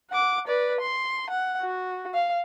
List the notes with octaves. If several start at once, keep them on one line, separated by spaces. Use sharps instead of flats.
F#5 D6
B4 D5
C6
F#5
F#4
F5